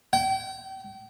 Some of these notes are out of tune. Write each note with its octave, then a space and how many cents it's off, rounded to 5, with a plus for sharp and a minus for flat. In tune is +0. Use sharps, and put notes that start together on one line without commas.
G5 -35